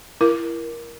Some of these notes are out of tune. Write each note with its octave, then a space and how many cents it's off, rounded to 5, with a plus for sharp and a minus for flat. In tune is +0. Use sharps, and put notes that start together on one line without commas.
E4 +30 A#4 +15